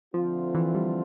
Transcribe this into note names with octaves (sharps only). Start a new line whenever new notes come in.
D3 F3 A3 C4 F4
E3
G3